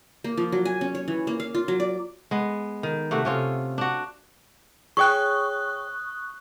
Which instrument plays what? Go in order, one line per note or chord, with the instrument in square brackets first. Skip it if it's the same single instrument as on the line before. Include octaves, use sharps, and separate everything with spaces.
[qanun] A#3
F3
F#3
G#5
C#4
C#5
E3
A#3
F5
F4
F#3
D5
[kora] G#3 B3
D#3
C3 A3 F#4
C3 C#4 F4
D4 F#4
[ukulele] G#4 C#5 G5 [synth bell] C#6 D#6 F#6